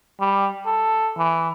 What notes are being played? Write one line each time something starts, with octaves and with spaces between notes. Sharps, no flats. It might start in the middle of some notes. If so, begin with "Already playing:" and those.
G3
A4
E3